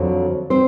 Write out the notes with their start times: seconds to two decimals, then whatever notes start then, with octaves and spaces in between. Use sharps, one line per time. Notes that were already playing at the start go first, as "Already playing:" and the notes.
Already playing: F2 D3 F#3
0.50 C4 C5